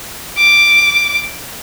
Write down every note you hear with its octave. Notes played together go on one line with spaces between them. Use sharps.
D6